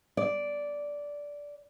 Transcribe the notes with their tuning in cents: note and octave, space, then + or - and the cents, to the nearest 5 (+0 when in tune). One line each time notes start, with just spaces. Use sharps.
D5 -10